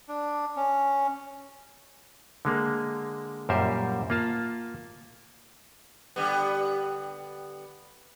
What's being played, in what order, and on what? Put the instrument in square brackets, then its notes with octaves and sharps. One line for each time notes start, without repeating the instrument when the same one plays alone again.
[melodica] D4
C#4
[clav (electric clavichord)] D3 G#3 A#3
F#2 A#2 G3 A#4 C5 E5
A#3 F4 A5
[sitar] D3 G3 B3